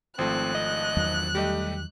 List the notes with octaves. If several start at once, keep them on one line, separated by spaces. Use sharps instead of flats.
G#1 F3 A3 C4 F#6
D#5
E2 D#3 F#3
G3 A3 G4 D#5